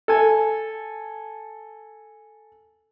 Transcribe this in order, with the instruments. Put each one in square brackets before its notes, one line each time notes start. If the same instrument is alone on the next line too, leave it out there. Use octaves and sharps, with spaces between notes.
[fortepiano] A4 G#5